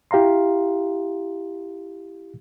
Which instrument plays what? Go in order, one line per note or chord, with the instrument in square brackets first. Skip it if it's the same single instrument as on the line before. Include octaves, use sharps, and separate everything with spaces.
[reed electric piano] E4 G4 F5 A#5 C6